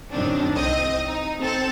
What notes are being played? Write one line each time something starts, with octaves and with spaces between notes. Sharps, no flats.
F#2 D#3 C4 D4
C2 C4 D#5
D#4
C4 A4